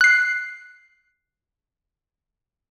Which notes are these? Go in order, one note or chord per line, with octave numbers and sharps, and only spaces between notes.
F#6 C7